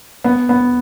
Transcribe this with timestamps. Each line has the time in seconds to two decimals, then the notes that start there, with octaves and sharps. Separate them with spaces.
0.24 B3
0.49 B3